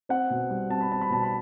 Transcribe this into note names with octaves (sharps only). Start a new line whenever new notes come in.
C4 F#5
B2
G3
C4 A5
B5
C4 A5
B5
B2 A5
B5